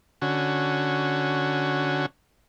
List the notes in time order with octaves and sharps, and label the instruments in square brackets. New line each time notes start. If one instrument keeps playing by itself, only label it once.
[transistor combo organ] D3 C#4 F#4